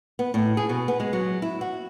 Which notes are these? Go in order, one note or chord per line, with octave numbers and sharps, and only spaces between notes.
B3
A2
G#4
B2
B3
G#3
F#3
E4
F#4